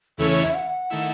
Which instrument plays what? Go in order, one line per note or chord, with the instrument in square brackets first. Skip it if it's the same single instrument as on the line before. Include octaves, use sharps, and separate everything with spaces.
[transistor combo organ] E2 C#3 E3 A3 C#4 [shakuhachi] A4
[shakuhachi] C#5
E5
F#5
[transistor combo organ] D#3 A3 E4